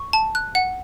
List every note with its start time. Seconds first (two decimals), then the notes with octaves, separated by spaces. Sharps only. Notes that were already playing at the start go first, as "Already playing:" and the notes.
Already playing: C#6
0.13 A5
0.35 F#6
0.55 F#5